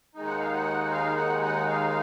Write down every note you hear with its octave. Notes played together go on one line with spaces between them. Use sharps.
D#2 D#3 G#3 D#4
F#5
F5
F#5
F5
F#5
F#5
F5